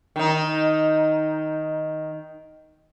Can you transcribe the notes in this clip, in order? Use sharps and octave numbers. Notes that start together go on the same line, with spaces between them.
D#3 D#4